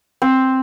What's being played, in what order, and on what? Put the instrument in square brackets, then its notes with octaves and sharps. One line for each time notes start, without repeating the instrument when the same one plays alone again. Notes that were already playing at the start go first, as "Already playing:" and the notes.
[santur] C4